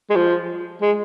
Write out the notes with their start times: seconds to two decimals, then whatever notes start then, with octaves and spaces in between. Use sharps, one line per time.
0.10 G#3
0.15 F3
0.81 G#3